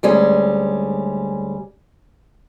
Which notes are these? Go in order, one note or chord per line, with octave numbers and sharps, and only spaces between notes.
D2 G3 G#3 C#4